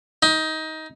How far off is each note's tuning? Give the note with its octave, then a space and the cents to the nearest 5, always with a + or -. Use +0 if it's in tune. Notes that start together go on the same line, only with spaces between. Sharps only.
D#4 +20